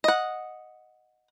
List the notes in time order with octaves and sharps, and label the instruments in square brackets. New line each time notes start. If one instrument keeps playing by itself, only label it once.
[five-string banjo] D#5 F#5